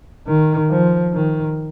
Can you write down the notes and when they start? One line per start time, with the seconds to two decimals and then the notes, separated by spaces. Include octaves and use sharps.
0.28 D#3
0.70 F3
1.13 D#3